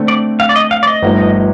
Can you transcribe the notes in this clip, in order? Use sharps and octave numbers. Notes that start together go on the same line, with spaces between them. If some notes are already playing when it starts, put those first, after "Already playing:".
Already playing: D3 A3 C4
D5
F5
D5
D#5
F5
D5
D#5
G1 G2 F3 A3 D#4